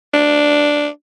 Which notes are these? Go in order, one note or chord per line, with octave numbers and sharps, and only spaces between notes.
D4